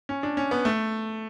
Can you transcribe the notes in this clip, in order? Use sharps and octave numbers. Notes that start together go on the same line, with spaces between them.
C#4
D4
C#4
B3
A3